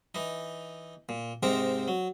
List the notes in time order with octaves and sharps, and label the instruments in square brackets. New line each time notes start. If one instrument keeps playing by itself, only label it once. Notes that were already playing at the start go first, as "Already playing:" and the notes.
[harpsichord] E3 D#4
A#2
G#2 C3 C4 D#4 A#4 A#5
F#3